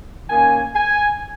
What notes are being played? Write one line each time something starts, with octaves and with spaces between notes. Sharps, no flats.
D#3 A#3 C#4 G#5
G#5